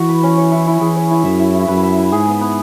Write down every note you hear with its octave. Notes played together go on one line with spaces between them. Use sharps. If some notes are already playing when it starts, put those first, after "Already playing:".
Already playing: E3 E4 F#4
B4
C#4
C#5
E4
E4
E3 G#4
C#5
E4
F#2 E5
E4
E4
F#2 B4
E5
E4
G#2 G#4
B3
B3